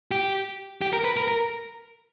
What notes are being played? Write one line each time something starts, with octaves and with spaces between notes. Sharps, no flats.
G4
G4
A#4
B4
A#4
A#4